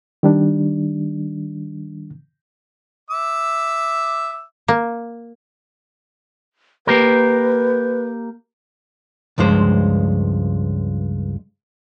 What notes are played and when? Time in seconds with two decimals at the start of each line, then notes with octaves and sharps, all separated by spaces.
0.23 D#3 G3 D4
3.10 E5 D6 E6
4.68 A#3
6.87 A#3 G4 A#4 B4
9.38 C#2 G2 F3 G#3 C5